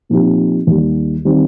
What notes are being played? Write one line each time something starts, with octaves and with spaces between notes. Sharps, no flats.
A#2 F3 C4 D#4 G4
D#2 D#3 G3
D#3 G3 C4